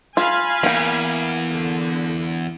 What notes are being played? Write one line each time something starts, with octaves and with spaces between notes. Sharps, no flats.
F4 F5 G#5 B5
E2 A#3 G5
D3